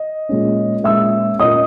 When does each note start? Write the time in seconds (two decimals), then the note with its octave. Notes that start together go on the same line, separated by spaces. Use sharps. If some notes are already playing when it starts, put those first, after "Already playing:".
Already playing: D#5
0.29 A#2 G#3 C#4
0.84 A#2 G#3 C#4 E5 E6
1.39 A#2 A#3 C#4 D#5 D#6